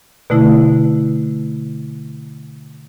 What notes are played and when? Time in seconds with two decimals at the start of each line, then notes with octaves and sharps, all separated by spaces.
0.30 B2 D3 A3 E4